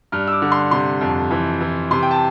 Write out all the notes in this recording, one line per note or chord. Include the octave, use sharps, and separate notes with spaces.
G2 F6
E6
D6
D3
C6
C3 C6
F2
E3
E3
C3 C6
G5
A5